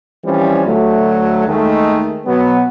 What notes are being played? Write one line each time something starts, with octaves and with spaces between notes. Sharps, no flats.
E3 F3 G3 C4 C#4
D2 F#3 A3
D#2 D#3 G#3 A3
B2 F#3 B3